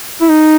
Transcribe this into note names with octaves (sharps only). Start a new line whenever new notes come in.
E4
D#4